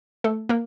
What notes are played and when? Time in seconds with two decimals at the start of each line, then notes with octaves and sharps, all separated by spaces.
0.24 A3 A4
0.49 A#3 A#4